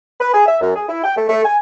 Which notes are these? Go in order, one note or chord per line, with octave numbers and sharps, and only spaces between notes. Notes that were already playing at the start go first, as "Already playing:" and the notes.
B4
G#4
E5
F#2
G#4
E4
G5
A3
A3
G#5